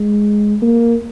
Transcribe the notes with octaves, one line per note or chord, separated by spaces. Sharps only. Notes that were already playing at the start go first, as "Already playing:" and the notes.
Already playing: G#3
A#3